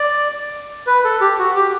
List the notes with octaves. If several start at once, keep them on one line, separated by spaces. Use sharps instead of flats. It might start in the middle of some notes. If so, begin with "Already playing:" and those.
Already playing: D5
B4
A4
G4
F#4
G4